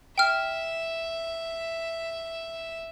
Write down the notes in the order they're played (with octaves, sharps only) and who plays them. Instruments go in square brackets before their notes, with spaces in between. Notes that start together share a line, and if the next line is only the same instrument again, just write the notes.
[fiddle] E5 [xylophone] G5 F6